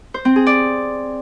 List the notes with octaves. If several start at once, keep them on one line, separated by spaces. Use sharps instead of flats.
C5
C4
G#4
D5